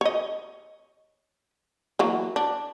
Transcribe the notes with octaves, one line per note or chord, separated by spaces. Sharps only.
C#5 D#5
E3 F#3 A#3
D4